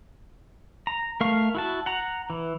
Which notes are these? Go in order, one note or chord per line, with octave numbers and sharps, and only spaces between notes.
A#5
A3 A#4 F5 C#6
E4 F#4 A5
F#5 A#5
E3